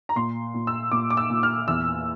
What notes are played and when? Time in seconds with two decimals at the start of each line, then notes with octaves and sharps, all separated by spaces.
0.09 A#5
0.16 A#2 C6
0.54 A#2
0.67 E6
0.91 A#2 D6
1.10 D6
1.17 E6
1.30 A#2
1.43 F6
1.68 E2 E6